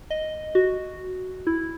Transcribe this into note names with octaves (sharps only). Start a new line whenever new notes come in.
D#5
F#4
E4